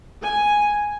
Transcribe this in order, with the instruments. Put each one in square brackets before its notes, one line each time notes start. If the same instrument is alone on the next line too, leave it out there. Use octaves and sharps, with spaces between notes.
[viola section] G#5